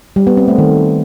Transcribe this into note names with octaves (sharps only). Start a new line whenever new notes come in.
G3
B3
C4
A3
D#3